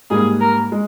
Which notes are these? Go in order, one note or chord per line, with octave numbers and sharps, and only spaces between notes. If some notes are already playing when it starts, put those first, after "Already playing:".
G#2 G3 A#3 G#4
A#4
G#3